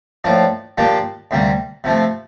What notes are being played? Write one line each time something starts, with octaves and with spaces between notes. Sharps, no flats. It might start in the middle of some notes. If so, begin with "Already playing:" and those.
A2 F3 A#3 D4
A#2 F3 A#3 D4 G4
D2 C3 G3 A#3
C3 F3 A3